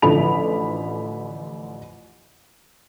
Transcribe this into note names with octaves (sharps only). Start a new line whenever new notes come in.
A1 D3 F3 B5 F7